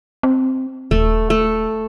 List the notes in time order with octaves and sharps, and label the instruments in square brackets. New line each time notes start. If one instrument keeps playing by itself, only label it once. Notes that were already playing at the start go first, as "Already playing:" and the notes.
[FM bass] C4
[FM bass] D#1 [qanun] A3
[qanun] A3